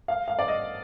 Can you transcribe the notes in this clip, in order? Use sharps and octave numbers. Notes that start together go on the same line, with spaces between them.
F5
F5
D5
D#5